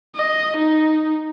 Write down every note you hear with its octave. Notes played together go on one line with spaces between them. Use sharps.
D#5
D#4